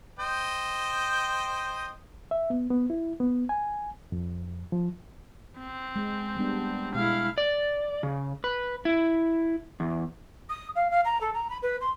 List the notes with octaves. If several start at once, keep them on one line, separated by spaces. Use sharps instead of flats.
C5 D#5 G5
E5
B3
B3
E4
B3
G#5
F2
F3
C4
G#3
G3 B3 D4
B2 G#3 E4 F5
D5
C#3
B4
E4
E2
D#6
F5
F5
A#5
A4
A#5
B5
B4
C6